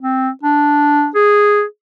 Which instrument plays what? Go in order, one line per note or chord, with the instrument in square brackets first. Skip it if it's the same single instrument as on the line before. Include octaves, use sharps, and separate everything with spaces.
[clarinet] C4
D4
G#4